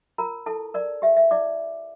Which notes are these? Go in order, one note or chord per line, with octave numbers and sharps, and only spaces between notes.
F4 A#4 A#5
E4 A4 A5
A#4 D5
G4 E5
E5
E4 D5 D6